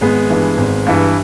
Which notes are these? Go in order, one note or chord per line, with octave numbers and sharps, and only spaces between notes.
G#1 G#3 B3
G2 E3
G#1
G2 E3